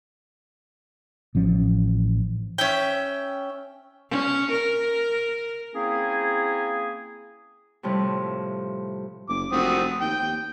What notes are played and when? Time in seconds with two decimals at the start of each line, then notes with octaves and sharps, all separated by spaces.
1.35 A1 F3 C#4
2.58 C#4 E5 G5
4.10 C#4
4.51 A#4
5.75 A#3 C4 C#4 E4 G#4
7.83 A2 C3 F3 G3
9.29 F#1 D6
9.52 F1 C4 F#4 D#6
10.01 D#2 G5
10.22 D#2